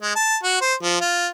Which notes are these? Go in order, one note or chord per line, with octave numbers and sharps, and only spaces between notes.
G#3
A5
F#4
C5
F3
F4